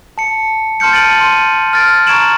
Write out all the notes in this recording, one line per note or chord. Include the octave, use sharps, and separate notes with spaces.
A5 C#7
A5 C6 F6 G6 C#7
A6 D7 D#7 F#7
C6 D#7
F6 A6 D7
A#5 C#6 G#6 D7 E7 F#7